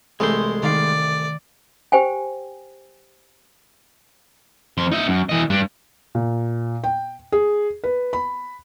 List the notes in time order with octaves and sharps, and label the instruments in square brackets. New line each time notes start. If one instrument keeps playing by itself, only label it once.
[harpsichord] C2 E3 A3 [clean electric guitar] G#3 C5
[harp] D#3 F5 C7 [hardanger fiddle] D5
[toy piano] G4 C5 G5 G#5
[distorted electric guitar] F2 C6
D#4 E5
F#2
E3 D#5
G2 D4
[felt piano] A#2
G5
G#4
B4
B5